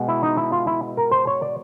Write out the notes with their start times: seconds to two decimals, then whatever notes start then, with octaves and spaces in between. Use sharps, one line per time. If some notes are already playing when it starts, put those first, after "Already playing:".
Already playing: B2 G#3 B3
0.08 E4
0.23 D#4
0.37 E4
0.52 F4
0.67 E4
0.97 A#4
1.11 C5
1.27 C#5
1.42 D5